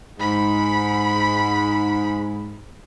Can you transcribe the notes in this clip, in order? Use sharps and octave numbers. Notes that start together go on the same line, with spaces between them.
G#2 B5